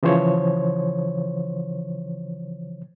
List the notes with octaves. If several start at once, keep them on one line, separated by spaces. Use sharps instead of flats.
C#3 E3 F3 C5 C#5